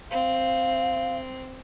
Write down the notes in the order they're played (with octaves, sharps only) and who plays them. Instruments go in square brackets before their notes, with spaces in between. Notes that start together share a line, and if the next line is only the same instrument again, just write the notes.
[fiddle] C4 [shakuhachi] F5